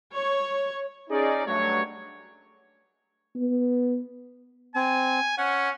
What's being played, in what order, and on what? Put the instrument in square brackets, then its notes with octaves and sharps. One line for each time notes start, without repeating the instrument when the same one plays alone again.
[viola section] C#5
[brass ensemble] C#4 D#4 G#4 D5
G2 F#3 A3 C#5
[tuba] B3
[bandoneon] C4 [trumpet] G#5
[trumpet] C#4 [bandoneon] F#5